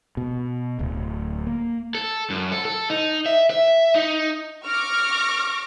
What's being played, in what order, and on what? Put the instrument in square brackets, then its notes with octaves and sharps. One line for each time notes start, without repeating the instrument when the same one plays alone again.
[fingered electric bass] B2
D1 D2
A#3
[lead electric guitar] A4
F#2
A4
A4
D#4
E5
E5
D#4
[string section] C#6 D6 F6 A#6